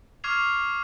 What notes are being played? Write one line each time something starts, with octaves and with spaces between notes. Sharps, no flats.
C#6 D6 F6 G#6 C7 F7